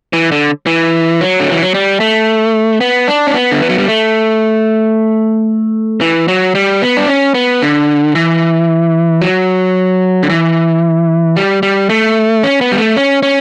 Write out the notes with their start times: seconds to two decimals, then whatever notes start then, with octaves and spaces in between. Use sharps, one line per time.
0.13 E3
0.32 D3
0.66 E3
1.21 F#3
1.40 D3
1.52 E3
1.62 F#3
1.74 G3
2.00 A3
2.81 B3
3.08 D4
3.27 C#4
3.34 B3
3.51 D3
3.61 E3
3.69 F#3
3.78 G3
3.88 A3
6.01 E3
6.28 F#3
6.55 G3
6.82 B3
6.97 D4
7.08 C#4
7.34 B3
7.62 D3
8.15 E3
9.22 F#3
10.23 D3
10.30 E3
11.36 G3
11.63 G3
11.90 A3
12.43 C#4
12.61 B3
12.72 G3
12.78 A3
12.97 C#4
13.23 C#4